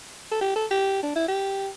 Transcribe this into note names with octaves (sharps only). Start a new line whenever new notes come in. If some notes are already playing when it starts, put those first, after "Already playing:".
A4
G4
A4
G4
D4
E4
G4